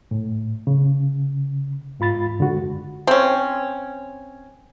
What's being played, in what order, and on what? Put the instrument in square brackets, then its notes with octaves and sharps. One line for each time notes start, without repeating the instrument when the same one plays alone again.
[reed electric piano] A2
C#3
G#2 F4 B5 A6
F#2 D3 G#3 F#4
[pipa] C4 C#4